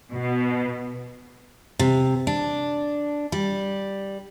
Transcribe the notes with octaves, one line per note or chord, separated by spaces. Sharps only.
B2
C3
D4
G3